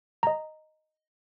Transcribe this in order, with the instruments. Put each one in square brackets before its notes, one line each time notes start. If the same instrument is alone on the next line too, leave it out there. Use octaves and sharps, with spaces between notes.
[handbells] D#5 A#5